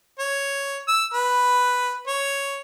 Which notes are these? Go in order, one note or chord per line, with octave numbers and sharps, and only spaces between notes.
C#5
E6
B4
C#5